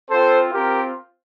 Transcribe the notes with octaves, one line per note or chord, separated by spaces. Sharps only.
C4 F4 A4 C5
C4 F4 G4 A#4